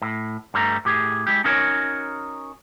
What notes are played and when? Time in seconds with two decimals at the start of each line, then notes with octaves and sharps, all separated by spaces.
0.02 A2
0.54 G2 G3 A3 A#5
0.85 A2 G4 G#4
1.27 G#3 E4 G4
1.44 C#4 D#4 F#4 A#4 C#5